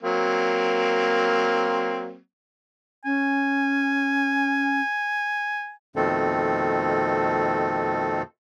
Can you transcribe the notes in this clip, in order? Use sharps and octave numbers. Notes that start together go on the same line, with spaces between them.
F#3 A#3 C4
C#4 G#5
F2 B2 D#3 A3 C4 A4